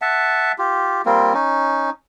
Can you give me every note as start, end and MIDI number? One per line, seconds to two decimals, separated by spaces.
0.02 0.52 76
0.02 0.52 78
0.02 0.52 81
0.58 1.02 65
0.58 1.02 67
1.06 1.33 55
1.06 1.33 58
1.06 1.33 60
1.06 1.33 65
1.34 1.90 61
1.34 1.90 63